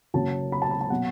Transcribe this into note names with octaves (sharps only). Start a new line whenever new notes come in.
F#1 F#2 F#3 A5
B5
A5
B5
A5
B2 F#3 F#5